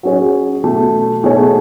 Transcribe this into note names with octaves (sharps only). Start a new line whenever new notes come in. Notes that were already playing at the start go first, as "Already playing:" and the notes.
F#3 C#4 G#4 C#5
B2 F#3 A3
B2 A3 D#4 G#4 C#5